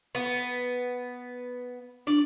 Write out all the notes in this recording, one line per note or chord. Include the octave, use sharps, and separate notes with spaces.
B3
D4 D5